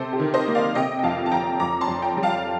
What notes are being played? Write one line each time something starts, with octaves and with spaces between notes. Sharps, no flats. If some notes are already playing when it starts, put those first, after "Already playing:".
Already playing: C3 A4 C5
G4
D#3
C5 D#5
A#3
D5 F5
C3 D#5 G5
G5
F2 F5 A5
A5
F2 G5 A#5
F2 A#5 D6
A5 C6
F2
G5 A#5
G3
F5 A5